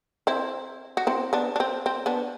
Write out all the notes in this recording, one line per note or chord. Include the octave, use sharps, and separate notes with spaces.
C4 E4
F#4
C4 E4
B3 D4
D4
C4
C4
B3 D4